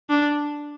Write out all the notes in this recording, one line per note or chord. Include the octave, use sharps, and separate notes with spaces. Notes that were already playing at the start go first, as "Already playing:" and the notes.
D4